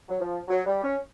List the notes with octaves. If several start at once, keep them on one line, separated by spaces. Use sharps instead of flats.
F#3
F3
F#3
G3
C#4